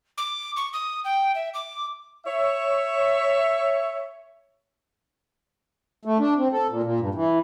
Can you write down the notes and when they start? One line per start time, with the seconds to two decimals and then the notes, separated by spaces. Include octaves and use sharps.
0.17 D6
0.56 C#6
0.73 D#6
1.04 G5
1.35 E5
1.54 D6
2.26 C#5 E5
6.05 A3
6.19 D4
6.38 C4
6.53 A4
6.70 A#2
6.83 A#2
7.00 G2
7.15 E3